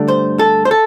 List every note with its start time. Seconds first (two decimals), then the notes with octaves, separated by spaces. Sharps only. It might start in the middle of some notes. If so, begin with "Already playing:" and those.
Already playing: G2 D3 A3 D4
0.08 C5
0.39 A4
0.65 C5
0.71 A4